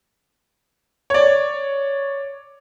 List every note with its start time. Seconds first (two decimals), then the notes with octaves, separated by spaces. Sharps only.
1.10 C#5 D5